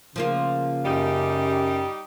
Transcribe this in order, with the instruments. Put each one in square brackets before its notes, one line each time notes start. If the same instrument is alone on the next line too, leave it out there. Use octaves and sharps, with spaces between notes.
[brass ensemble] C#3 [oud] F3 A#3 F4
[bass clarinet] F#2 [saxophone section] G3 D#4 G4